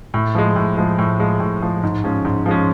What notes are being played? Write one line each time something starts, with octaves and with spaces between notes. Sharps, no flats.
A2
F3 G#3
A2
F3 G#3
A2
F3 G#3
A2
F3 G#3
G#2
F3 G#3 C#4
G#2
F3 G#3 C#4